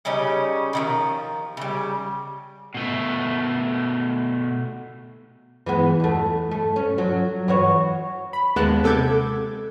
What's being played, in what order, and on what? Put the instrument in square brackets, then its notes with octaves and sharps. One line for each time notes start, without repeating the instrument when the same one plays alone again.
[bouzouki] C#3 G3 C#4 D#4
D3 D#3 F3
C#3 G3
[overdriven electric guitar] B2 A3
[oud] E3 G#3 B3
E2 A3
A3
C#4
F#3
E3 F#4 C#5
[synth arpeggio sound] B5
D#2 G#3 B3 A5 F#6
C3 A4 D6 G6 G#6